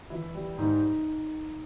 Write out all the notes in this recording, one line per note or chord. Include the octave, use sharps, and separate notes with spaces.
E3 E4
G3
G#2 D#4